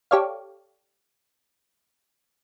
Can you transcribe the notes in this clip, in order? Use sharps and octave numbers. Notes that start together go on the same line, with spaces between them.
G4 A4 C#5 D5 F5